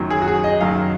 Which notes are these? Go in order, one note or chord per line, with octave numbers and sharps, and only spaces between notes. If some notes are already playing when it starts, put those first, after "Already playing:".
Already playing: F#2 D#3 F#3
G#4
F#4
G#4
D#5
F#2 D#3 F#3 F5